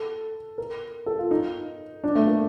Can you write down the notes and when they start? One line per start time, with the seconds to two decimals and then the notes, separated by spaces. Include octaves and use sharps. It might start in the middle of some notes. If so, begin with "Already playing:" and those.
Already playing: A4
0.58 A#4
1.06 A4
1.19 F4
1.31 D#4
2.04 D4
2.15 A3
2.27 A#3